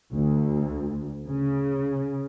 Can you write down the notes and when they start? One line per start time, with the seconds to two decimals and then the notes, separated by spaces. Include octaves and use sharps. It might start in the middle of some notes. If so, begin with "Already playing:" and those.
0.11 D2
1.27 C#3